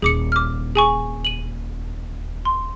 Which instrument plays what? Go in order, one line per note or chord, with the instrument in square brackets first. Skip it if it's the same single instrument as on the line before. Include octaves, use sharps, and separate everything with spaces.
[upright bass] D#1 [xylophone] G#4 D6 C#7
[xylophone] D6 F6
G#4 G#5 C#6
D#7 F#7
C6